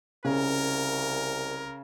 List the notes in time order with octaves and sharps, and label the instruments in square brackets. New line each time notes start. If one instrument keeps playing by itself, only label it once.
[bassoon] C2 [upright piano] C#3 [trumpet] A#4